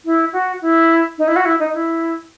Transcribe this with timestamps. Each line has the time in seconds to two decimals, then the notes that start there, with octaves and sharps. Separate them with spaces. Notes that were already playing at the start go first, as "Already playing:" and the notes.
0.05 E4
0.32 F#4
0.61 E4
1.18 D#4
1.27 E4
1.36 F#4
1.45 E4
1.59 D#4
1.73 E4